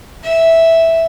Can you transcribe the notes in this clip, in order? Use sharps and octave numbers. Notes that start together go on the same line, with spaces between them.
E5